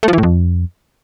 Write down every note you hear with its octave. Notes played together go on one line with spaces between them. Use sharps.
A3
F3
E3
A2
F2